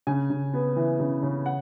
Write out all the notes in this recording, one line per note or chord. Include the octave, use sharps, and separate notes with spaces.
C#3 G#5
C#3
B3
E3
C#3
C#3
F#5